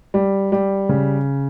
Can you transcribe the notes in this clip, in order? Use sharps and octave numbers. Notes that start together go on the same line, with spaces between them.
G3
G3
C#3